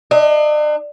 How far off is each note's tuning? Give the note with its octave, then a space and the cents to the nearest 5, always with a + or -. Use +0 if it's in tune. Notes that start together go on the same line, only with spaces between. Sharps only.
D4 +40 D#5 +35